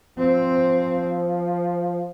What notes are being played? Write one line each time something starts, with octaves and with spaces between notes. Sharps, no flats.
F3 C4